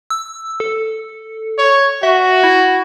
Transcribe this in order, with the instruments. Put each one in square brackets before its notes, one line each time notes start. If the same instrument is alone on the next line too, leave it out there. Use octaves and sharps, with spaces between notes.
[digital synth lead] E6
A4
[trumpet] C#5
[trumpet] F#4 [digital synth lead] E5
[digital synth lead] E4